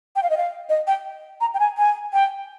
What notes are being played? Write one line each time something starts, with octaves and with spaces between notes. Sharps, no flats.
G5
F5
D#5
F5
D#5
G5
A#5
G5
G#5
G#5
G5